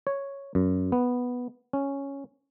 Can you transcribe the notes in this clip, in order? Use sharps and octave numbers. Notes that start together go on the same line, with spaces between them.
C#5
F#2
B3
C#4